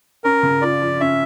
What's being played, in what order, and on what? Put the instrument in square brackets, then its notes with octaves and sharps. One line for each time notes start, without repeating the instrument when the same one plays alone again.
[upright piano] C#4 [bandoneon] A#4
[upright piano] C#3
[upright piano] F4 [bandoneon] D5
[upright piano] F3
[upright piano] C#4 [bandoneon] E5